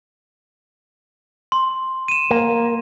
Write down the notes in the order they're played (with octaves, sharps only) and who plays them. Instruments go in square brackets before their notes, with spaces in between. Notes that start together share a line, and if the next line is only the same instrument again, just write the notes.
[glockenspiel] C6
D#7 E7
[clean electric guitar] A#3